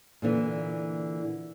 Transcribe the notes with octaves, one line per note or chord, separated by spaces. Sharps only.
A#2 D3 E3